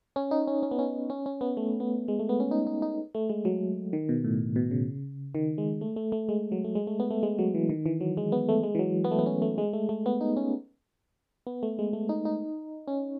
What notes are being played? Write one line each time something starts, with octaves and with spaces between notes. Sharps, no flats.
C#4
D#4
C#4
C#4
B3
C#4
C#4
C#4
B3
A3
B3
G#3
A3
B3
C#4
D#4
D#4
D#4
A3
G#3
F#3
D#3
B2
A2
B2
C#3
D#3
G#3
A3
A3
A3
G#3
F#3
A3
G#3
A3
B3
A3
G#3
F#3
E3
D#3
E3
F#3
G#3
B3
A3
G#3
E3
F#3
B3
A3
B3
C#4
A3
G#3
A3
A3
B3
D#4
C#4
B3
A3
G#3
A3
D#4
D#4
C#4